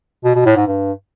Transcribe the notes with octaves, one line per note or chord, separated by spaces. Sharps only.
B2
B2
A2
G#2
G2